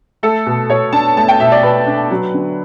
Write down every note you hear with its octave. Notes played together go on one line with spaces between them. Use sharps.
A3 A4
B2
B2 C#5
D4 A5
A3 A5
G5
B2 E5
D5
B2 B4
D4
F#3
D3